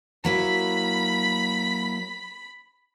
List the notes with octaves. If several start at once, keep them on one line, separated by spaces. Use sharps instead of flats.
F#3 A#3 E4 B5 B6